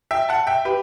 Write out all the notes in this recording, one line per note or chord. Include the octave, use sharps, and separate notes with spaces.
E5 G5
F#5 A5
E5 G5
G4 B4